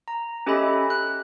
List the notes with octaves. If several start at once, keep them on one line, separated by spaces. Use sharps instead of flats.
A#5
C#4 G4 A4 D#5 E5 B5
F#6